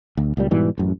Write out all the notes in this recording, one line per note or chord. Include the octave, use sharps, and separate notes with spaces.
D2
C#2 A#2 G3
G#2 B2 E3 G3
A1 F#2